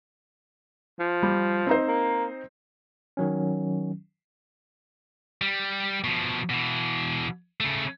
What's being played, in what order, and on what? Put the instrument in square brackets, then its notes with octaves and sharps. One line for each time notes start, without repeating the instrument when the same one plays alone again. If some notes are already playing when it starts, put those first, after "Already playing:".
[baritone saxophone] F3
[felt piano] G3
C4 D#4 C5
[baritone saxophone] A#3
[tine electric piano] D#3 F#3 C#4
[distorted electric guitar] G3
B2 F3
B2 E3
C#3 A3